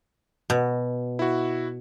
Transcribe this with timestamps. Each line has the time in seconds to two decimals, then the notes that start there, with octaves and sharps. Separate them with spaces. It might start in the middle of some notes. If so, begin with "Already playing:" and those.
0.50 B2
1.19 E4 F#4